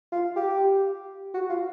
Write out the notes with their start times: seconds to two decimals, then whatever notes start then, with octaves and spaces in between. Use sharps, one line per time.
0.12 F4
0.36 G4
1.34 F#4
1.49 F4